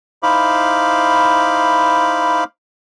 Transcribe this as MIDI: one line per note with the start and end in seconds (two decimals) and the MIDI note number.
0.23 2.44 63
0.23 2.44 64
0.23 2.44 72
0.23 2.44 77
0.23 2.44 83
0.23 2.44 86